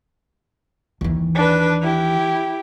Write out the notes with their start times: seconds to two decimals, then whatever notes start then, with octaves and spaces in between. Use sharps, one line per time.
1.01 D#2 E3
1.35 D4 B4
1.82 E4 G4